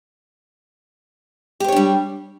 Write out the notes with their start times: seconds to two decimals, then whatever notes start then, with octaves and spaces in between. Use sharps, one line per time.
1.60 G4
1.64 C5
1.68 C#5
1.72 D4
1.76 G3